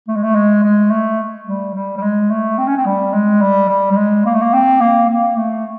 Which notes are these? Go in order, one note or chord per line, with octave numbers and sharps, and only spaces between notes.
A3
G#3
A3
G#3
G#3
A3
G3
G3
G3
G#3
A3
C4
C#4
C4
G3
G#3
G3
G3
G3
G#3
A#3
A3
A#3
C4
A#3
A#3
A3